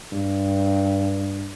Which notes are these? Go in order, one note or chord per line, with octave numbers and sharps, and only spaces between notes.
G2